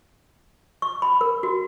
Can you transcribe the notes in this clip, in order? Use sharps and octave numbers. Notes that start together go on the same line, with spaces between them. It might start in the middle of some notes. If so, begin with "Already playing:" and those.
C#6
B5
A#4
F#4